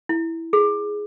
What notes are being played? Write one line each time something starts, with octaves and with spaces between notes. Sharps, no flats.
E4
G#4